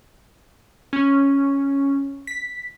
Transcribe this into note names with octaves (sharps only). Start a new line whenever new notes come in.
C#4
B6